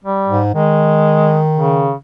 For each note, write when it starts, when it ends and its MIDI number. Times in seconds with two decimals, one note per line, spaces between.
0.04 0.39 55
0.28 0.50 44
0.54 1.94 51
0.54 1.40 56
1.57 1.93 49